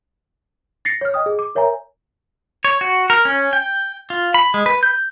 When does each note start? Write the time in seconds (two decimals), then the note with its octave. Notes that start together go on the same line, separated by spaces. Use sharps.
0.85 A6 A#6 C7 C#7
1.01 C#5 F6
1.14 D#5 G5 D#6
1.26 G#4
1.39 D6
1.55 A#4 C#5 E5 G#5 A#5
2.65 C#5
2.81 F#4
3.10 A#4
3.25 C#4
3.53 G5
4.10 F4
4.34 B5
4.54 G#3
4.66 B4
4.83 G6